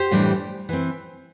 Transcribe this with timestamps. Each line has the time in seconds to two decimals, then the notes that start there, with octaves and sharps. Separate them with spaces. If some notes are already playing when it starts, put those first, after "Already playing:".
Already playing: G4 C5
0.11 A2 E3 G3 D4
0.69 E3 C4